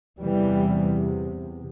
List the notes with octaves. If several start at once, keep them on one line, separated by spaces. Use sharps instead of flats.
E2 C3 E3 G3